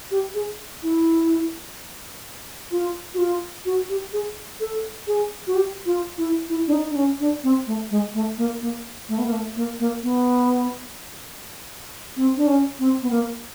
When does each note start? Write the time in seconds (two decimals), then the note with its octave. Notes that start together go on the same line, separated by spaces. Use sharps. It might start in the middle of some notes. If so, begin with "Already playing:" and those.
0.11 G4
0.34 G#4
0.83 E4
2.71 F4
3.14 F#4
3.18 F4
3.65 F#4
3.89 G4
4.13 G#4
4.60 A4
5.07 G#4
5.47 F#4
5.55 G4
5.86 F4
6.18 E4
6.49 E4
6.67 D4
6.73 D#4
6.90 D4
6.96 C#4
7.20 D4
7.44 C4
7.67 A3
7.91 G#3
8.14 A3
8.38 A#3
8.62 A#3
9.09 A3
9.18 B3
9.25 A#3
9.32 A3
9.56 A#3
9.80 A#3
10.03 B3
12.16 C4
12.37 D4
12.47 C#4
12.79 C4
13.02 B3
13.10 A#3